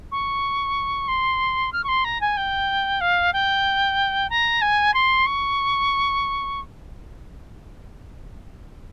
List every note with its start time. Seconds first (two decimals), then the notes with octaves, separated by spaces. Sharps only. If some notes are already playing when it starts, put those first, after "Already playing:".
0.11 C#6
1.08 C6
1.72 F6
1.84 C#6
1.88 C6
2.04 A#5
2.21 G#5
2.37 G5
3.01 F5
3.33 G5
4.30 A#5
4.61 G#5
4.94 C6
5.26 C#6